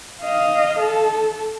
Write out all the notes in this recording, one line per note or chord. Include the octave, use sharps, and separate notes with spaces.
D#5 F5
A4